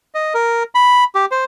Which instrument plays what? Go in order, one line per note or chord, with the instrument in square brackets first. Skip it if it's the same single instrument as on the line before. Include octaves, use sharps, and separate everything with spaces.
[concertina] D#5
A#4
B5
G4
C5